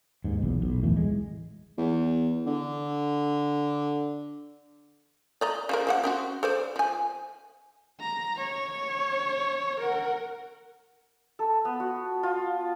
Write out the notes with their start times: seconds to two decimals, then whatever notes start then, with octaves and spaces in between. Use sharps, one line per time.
0.24 D#2 G#2
0.42 B1 E2
0.62 B1
0.83 D1 A1 E3 A3
0.97 G#3
1.78 E2
2.46 D3
5.41 D5 D#5 A#5
5.69 C#3 F3 A#4
5.87 F3 A#3 F#5
6.04 C4 C#4 F#4
6.43 A4 C5 D5
6.76 F3 G#5
8.00 A#5
8.36 C#5
9.80 A#4 F#5
11.39 A4
11.65 B3
11.80 F#4
12.23 F4